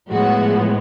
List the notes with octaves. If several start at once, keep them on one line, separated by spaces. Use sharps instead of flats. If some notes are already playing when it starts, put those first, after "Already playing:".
A2 F3 G#3 B3 F#4